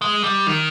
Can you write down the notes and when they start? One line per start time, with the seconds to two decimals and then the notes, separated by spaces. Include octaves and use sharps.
0.01 G#3
0.24 G3
0.47 D#3